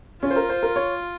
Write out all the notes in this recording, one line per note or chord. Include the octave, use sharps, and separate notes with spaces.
C#4 F4
C5
A#4
C5
A#4
C#5